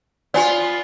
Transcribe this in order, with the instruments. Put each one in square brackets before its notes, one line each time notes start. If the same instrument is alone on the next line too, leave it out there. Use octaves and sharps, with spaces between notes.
[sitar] B3 F4 [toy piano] D5 G#5